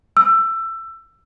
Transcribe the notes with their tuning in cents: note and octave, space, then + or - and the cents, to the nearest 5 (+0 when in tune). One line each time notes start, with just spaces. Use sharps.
E6 +20